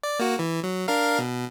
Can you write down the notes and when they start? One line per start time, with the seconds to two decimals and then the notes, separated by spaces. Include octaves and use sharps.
0.03 D5
0.19 A#3 F#4
0.39 E3
0.63 F#3
0.88 D4 A#4 F5
1.18 B2